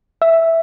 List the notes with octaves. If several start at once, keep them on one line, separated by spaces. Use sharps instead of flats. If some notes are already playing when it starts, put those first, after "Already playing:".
E5